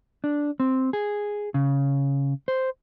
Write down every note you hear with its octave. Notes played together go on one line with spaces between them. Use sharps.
D4
C4
G#4
C#3
C5